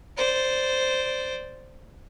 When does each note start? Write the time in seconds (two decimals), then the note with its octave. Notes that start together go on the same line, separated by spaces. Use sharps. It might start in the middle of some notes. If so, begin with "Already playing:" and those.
0.17 C5 D5